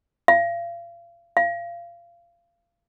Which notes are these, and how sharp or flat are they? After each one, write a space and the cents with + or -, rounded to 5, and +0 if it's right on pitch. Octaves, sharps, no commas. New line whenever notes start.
F5 -35
F5 -25